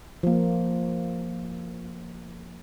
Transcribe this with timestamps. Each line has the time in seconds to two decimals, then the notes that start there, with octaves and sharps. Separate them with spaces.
0.23 F3 A#3